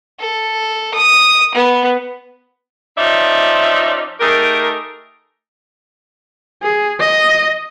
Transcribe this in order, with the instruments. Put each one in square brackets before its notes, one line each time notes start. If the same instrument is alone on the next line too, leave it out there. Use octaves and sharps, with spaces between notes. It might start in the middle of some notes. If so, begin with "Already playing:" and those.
[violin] A4
D#6
B3
[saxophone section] F3 C#4 D#4 D5 E5
A3 D#4 G4 G#4 A#4
[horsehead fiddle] G#4
D#5